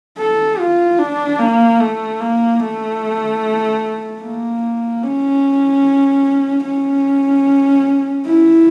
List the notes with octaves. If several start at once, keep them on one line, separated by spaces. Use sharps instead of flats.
A4
F4
D4
A#3
A3
A#3
A3
A#3
C#4
C#4
E4